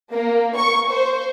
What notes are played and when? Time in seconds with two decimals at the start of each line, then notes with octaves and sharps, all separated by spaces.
0.11 A#3
0.56 C#6
0.89 C5